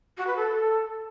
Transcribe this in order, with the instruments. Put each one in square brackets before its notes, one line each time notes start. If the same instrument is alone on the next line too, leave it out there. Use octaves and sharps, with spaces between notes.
[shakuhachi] F#4
B4
A4